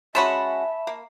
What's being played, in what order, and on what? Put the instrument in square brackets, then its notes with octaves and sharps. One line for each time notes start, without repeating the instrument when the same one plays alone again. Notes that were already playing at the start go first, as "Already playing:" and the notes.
[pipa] G#3 C#4 F#4 [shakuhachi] E5 [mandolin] A5 B5 C#6
[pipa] A#3